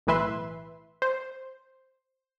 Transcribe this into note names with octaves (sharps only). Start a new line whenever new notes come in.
B1 A2 E3 B4 E5 C6
C5